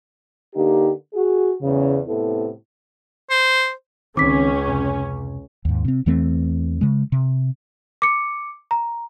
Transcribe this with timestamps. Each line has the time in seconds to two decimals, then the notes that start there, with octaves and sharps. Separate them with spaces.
0.55 D3 A#3 D#4 G4
1.14 F#4 G#4
1.62 E2 C#3
2.07 A2 C3 B3 E4 A4
3.30 C5
4.17 C#2 D#3 C4 C#4 D6 B6
4.68 F2 C3
5.65 D#2 G#2
5.85 C3 C4
6.06 E2 E3 A3 C4
6.81 C#3 G#3
7.12 C3
8.02 D6 C#7
8.71 A#5